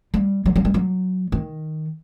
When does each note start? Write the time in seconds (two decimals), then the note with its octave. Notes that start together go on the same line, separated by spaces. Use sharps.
0.14 G3
0.46 F#3
0.56 F#3
0.65 G3
0.74 F#3
1.32 D#3